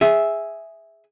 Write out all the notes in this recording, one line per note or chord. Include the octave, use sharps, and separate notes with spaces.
G#4 E5